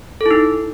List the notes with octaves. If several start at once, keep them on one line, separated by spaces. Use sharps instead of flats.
D#4 E4 A4